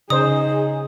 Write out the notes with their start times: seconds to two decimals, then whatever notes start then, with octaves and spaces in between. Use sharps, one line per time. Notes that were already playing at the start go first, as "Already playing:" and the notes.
0.10 C#3 D#4 G#4 C5 D#6